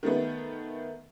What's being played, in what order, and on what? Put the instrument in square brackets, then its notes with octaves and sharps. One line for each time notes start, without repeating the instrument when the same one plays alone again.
[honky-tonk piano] D#3 A3 B3